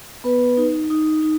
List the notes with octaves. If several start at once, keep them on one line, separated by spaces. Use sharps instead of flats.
B3 B4
D#4
D#4
D#4